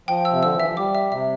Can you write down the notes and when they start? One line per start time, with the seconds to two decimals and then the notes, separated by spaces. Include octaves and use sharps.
0.08 F3 G5
0.25 E6
0.32 C3
0.43 D3 E6
0.55 E3 E5
0.66 F3
0.77 G3 D6
0.95 E5
1.12 C3 E5